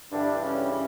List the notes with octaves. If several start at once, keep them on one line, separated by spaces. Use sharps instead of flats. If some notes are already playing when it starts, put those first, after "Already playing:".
G2 D3 E3 G3 D4
C#3 C#4
C#3 C#4